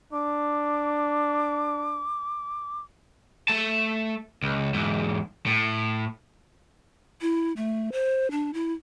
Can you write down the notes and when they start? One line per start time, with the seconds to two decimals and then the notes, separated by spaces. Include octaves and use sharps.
0.13 D4 D6
3.48 A3 A5
4.43 C#2
4.74 E2 G#2
5.46 A2
7.22 E4
7.57 A3
7.92 C5
8.31 D4
8.54 E4